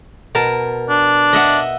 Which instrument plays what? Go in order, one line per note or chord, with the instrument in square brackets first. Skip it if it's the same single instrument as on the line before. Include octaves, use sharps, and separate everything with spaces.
[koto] B2 A#4 A5
[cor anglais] D4
[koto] D#5 E5 F#5